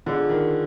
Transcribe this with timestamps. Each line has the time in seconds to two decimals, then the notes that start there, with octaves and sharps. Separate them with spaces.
0.06 D3 F4 G#4 C5 D#5
0.29 D#3